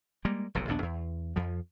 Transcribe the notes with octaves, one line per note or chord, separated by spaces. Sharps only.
G3 G#3 A#3
F1 B1 C3
A#1 D#2 B3 D4
E2
F2 F3